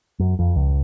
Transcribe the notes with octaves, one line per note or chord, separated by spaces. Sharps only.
F#2
F2
C#2